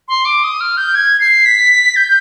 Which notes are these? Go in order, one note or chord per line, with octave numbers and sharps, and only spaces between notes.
C6
D6
D#6
F6
G6
G#6
C7
B6
G6